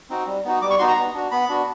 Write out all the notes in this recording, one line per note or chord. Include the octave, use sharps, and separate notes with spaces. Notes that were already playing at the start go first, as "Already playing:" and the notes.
C4 D#4 F#4
G3
B3 D#4 F#4
G3 D6
C#6
B3 D#4 F#4 C6
A#5
B3
D4 F#4
B3 B5
D4 F#4